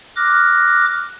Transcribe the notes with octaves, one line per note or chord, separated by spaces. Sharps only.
D6 F6 F#6 A#6